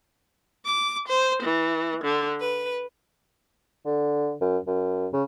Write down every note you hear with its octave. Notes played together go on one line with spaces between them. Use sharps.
D6
C5
E3
D3
B4
D3
F#2
F#2
C#3